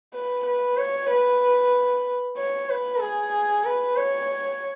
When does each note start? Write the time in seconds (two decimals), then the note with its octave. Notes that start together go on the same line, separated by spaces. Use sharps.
0.14 B4
0.46 B4
0.78 C#5
1.10 B4
2.37 C#5
2.70 B4
3.01 G#4
3.65 B4
3.97 C#5